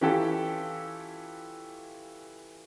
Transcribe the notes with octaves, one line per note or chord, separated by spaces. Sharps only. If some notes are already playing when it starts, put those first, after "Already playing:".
E3 C#4 F4 G4 A4